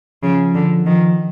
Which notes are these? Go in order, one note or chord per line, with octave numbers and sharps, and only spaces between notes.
C#3 F3
D3
D#3 F3